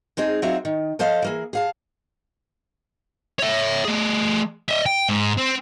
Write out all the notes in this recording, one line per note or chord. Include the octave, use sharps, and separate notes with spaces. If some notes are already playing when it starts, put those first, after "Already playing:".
G#3 C4 D#4 G#4
F#3 C4 D#4 F4 F#4 E5
D#3
F3 A4 C5 D#5 F5
E3 A#3 G#4
G#4 F5 A5
C#5 E5
A3 G#4
D#5 E5
G5
G#2
C4